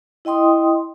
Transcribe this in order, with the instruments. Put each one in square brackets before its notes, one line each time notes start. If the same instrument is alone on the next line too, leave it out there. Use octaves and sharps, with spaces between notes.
[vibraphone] E4 D#5 G5 C6 D#6